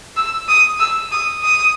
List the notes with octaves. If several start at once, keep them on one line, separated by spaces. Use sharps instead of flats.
E6
D#6
E6
D#6
D#6